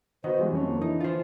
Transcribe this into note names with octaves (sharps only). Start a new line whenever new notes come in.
D#3 B3 F#4 C5 D#5
E3 G3 G#3
F2 C#4 C#5
A#3
D3 E3 D#4
F4 C5